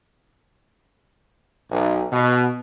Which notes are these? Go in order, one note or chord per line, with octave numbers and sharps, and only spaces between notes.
B1
B2